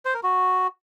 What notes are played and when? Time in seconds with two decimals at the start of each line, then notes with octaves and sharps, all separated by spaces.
0.05 C5
0.14 A#4
0.23 F#4